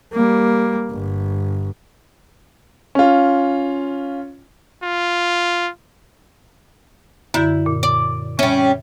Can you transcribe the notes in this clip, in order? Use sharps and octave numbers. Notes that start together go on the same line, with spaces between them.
G3 A#3
G1
C#4 F4
F4
F#2 D3 E4 G6
A#2
D5
G3 C#4 E5